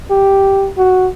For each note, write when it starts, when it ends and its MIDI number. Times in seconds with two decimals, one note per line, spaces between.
0.11 0.69 67
0.77 1.09 66